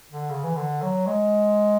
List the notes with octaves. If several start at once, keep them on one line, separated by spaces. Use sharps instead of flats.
D3
C#3
E3
D3
F#3
G#3